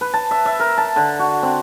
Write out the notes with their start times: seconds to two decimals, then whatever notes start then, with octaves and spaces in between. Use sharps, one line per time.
0.01 B4
0.14 A5
0.31 E5
0.45 E5
0.60 A#4
0.78 A5
0.96 D3
1.19 F#4
1.43 C4